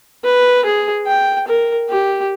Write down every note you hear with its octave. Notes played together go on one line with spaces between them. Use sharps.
B4
G#4
G5
A#4
G4